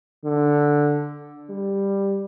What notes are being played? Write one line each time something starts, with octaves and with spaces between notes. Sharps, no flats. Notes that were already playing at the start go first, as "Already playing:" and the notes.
D3
G3